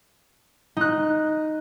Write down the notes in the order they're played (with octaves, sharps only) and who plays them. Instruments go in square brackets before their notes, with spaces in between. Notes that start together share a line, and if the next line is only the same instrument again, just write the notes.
[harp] D#4 F#6